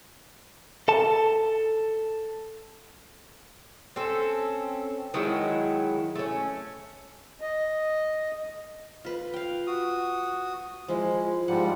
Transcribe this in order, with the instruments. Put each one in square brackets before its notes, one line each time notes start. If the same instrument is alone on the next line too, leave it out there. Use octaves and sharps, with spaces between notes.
[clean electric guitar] A4 A5
[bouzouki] C4 C#4 A4
D#3 F#3 G#3 E4
A3 C#4
[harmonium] D#5
[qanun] F4 B4
F5 G5
[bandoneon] F#4 D#6
[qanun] F3 E4 [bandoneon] G#3
[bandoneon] G#2 F3 G3 [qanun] F#5